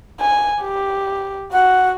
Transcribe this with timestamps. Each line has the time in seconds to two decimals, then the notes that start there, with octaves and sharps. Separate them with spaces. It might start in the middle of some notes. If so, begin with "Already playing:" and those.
0.21 G#5
0.62 G4
1.52 F#4 F#5